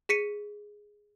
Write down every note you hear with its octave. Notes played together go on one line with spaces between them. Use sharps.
G#4 B6 C#7 D#7